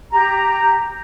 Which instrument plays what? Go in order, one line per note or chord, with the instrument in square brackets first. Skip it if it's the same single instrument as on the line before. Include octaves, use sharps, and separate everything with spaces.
[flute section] G4 A#5